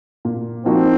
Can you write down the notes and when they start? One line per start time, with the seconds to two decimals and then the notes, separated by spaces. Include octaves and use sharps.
0.25 A#2
0.66 F3 A#3 C4 D#4 F#4